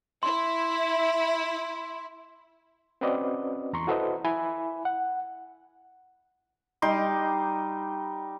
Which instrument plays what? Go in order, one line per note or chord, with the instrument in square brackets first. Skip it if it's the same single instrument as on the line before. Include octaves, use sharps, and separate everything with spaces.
[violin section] E4 [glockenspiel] C6
[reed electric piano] C4 C#4 F#4 B4 D5 D#5
E2 A#5 C6 C#6
E4 F#4 A4 B4 C5 D#5
E4 E5 G#5 B5
F#5
[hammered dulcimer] G3 D#4 C6 D6